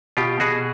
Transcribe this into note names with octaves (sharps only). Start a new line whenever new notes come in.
B2 F4 G4
B2 F#4 G#4